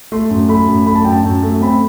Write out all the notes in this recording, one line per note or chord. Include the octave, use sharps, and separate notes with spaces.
A3 C6
F#2
A3 B5
F#2
A3 B5
A5
F#2 G5
A5
F#2
A3
C4 B5